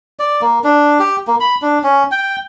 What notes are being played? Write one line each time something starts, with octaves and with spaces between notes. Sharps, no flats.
D5
A#3
D4
G4
A#3
B5
D4
C#4
G5